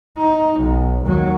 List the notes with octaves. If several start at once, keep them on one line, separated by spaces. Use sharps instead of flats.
D#4
B1
D#2 F#3